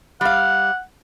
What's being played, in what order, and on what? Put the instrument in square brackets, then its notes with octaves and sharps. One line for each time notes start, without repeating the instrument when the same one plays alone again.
[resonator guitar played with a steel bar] G3 F5 [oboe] F#5